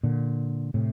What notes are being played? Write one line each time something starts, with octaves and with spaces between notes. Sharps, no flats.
A#2 D3
A2 C3